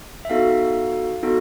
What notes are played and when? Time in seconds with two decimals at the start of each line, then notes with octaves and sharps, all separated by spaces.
0.25 E5
0.29 B3 D#4 F#4 A4 F5
1.23 B3 D#4 F#4 A4